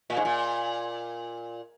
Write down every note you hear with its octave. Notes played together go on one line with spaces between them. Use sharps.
A#2
G#2
A#2